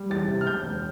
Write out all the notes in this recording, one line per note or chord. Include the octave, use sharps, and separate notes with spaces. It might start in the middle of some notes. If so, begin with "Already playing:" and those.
Already playing: G3
E2 A6
C3
F6
E1 G6
E1